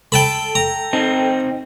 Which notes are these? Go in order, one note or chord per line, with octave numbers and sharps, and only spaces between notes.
A4 G5 A5 B5
G5 A#5
C4 D#4